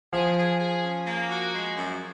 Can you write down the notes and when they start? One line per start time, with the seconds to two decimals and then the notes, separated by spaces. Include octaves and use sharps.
0.13 F3 G#4
0.36 G#4
0.59 G#4
0.82 C#4
1.06 A#3
1.29 F#4
1.53 G#3
1.76 F#2